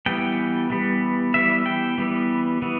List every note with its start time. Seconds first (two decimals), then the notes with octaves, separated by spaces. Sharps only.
0.06 E3 G3 B3 G5
0.70 E3 G3 B3
1.34 E3 G3 B3 E5
1.66 G5
1.98 E3 G3 B3
2.62 E3 B3